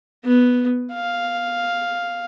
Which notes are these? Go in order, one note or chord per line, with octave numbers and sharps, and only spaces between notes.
B3
F5